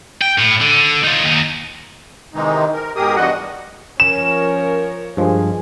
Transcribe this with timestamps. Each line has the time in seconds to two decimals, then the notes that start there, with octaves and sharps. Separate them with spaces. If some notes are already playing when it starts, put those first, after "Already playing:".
0.21 G5
0.38 A2
0.60 D3
1.04 D#4 F4
1.24 D#2 D#4
2.34 C3 D#3 E3 G#3 D#4
2.73 A#4
2.96 G#2 B2 G4 G#4 A#4 D#6
3.16 E2 G2 G3 F#4 D#5 F#5
4.00 F3 C#4 A#4 C#5 E7
5.17 G2 F3 G#3 G#4